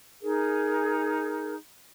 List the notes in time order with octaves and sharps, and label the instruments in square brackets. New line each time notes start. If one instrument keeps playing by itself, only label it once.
[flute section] D#4 G#4 A#4